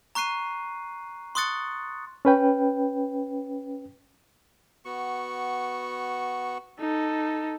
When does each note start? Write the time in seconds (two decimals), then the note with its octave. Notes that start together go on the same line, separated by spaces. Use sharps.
0.15 A#5 C#6 F#6 C7 D#7
1.35 C6 C#6 D#6 F#6 A6 C#7
2.25 C#4 B4 G5
4.85 B3 F#4 C#6
6.79 D#4 A4